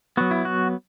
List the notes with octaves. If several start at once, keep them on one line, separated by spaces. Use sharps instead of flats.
F#3 B3 F#4
E4
F#4